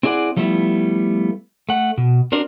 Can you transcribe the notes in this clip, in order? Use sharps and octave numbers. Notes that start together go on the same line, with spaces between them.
C4 E4 G#4 D5 F#5
F3 G3 A3 B3 E4
A3 F#5
B2
C4 D4 F#4 A#4 C5 D5